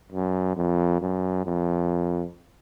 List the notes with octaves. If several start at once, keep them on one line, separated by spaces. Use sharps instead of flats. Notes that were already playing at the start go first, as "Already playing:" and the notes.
F#2
F2
F#2
F2